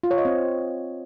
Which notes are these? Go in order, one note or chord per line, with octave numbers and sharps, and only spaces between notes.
F4
C#5
D#5
C4